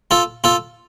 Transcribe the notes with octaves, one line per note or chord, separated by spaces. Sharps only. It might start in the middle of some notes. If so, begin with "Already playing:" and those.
F4 A4
F4 A4